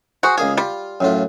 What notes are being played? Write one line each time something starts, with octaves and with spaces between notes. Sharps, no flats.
F#4 G#4 C5
C#2 A#3 G#4 F5
G3 F4
F#2 A2 F4